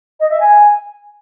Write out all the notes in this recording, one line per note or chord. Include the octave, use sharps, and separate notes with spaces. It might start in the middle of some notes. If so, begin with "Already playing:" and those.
D#5
E5
G#5